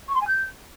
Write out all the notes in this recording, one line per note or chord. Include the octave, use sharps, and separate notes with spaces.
C#6
C6
G#5
G6